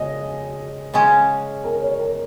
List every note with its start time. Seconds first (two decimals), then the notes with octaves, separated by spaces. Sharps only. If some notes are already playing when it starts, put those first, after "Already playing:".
Already playing: C#3 G#3 D#5
0.94 C#3 G#3 C#4
1.64 A#4
1.82 C#5
1.99 A#4